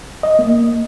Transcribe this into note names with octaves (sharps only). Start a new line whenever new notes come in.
D#5
A#3